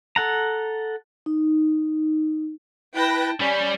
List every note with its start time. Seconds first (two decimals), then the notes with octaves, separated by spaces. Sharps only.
0.16 A4 F#5 A#5
1.26 D#4
2.95 E4 B4 G5 A5 B5 A#6
3.41 G3 C#4 D5 B5